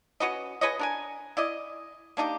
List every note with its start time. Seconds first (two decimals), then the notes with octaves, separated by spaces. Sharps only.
0.20 C#4 F#4 B4 D#5
0.61 G#4 B4 C#5 D#5
0.79 D4 A#4 G#5
1.37 E4 D5 D#5
2.17 A#3 D4 D#4 G4